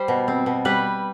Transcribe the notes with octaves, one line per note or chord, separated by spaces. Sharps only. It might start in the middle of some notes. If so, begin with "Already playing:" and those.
Already playing: G3 C5
B2
C4
B2
G3 B4